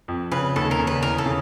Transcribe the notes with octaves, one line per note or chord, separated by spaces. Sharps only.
F2
C#3 B4
D#2 A4
A#4
C#3
B4
E2 A#4
A4
C#3